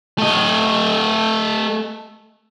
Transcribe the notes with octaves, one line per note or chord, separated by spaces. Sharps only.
A3 D#5